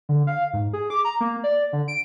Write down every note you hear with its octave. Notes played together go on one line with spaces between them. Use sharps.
D3
F5
G#2
G#4
D6
A#5
A#3
D5
D3
D7